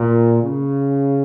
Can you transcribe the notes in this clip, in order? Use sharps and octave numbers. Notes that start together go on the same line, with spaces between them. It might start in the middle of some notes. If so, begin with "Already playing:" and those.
Already playing: A#2
C#3